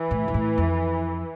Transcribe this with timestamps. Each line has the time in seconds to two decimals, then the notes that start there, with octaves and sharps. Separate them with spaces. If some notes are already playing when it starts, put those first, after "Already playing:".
Already playing: E3
0.11 A2
0.28 G2
0.34 A2
0.58 F2